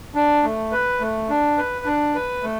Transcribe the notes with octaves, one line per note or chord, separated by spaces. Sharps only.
D4
A3
B4
A3
D4
B4
D4
B4
A3